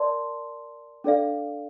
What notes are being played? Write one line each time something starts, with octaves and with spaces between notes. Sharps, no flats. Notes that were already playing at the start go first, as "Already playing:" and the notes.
Already playing: A#4 D5 A5 C6
D4 A4 D5 F5